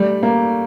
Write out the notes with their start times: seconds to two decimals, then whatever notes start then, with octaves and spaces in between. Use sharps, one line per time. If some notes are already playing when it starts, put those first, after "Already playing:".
Already playing: G3 A3
0.23 A#3